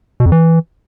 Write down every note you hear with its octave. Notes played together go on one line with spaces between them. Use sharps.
B2
F2
E3